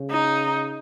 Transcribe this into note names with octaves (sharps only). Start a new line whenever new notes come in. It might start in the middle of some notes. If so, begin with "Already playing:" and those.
Already playing: C#3
D#4